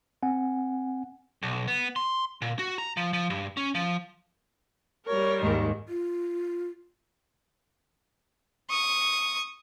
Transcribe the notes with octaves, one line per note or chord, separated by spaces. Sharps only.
C4 F#5 G#5
B1
B3
C6
A#2
F#4
A#5
F3
F3
G2
C#4
F3
G3 A#4 C#5
D#2 G#2 D#3
F4
C#6 D#6